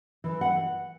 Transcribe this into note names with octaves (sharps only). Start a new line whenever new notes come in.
E3
F#5